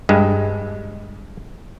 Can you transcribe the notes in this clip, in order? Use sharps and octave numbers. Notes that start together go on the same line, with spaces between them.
G2 G#3